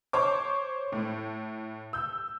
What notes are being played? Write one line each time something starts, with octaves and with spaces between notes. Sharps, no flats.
C5 C#5 D6
A2
E6 G6